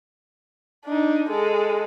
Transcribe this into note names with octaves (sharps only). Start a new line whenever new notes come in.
D4 D#4
G#3 A4